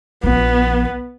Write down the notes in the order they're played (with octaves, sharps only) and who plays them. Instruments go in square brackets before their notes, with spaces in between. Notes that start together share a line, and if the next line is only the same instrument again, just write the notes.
[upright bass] A#1 F3 [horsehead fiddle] B3